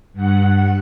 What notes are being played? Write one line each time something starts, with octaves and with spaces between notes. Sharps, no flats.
G2 F#5